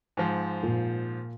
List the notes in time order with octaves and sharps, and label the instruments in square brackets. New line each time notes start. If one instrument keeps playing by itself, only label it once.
[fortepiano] G#2 F3
[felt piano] A#2